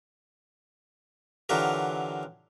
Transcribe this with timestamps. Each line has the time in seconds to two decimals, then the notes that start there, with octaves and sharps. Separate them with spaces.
1.49 D3 E3 F#3 F4 G4 A#4